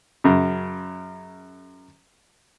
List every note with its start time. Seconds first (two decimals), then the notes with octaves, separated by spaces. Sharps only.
0.24 F#2 C#3